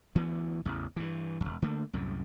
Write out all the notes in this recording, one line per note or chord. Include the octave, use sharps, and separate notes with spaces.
D2 E3 B3
A1 E2 C#3
G2 E3
E1 E2
D3 A3 A#3
C2 F#2 A2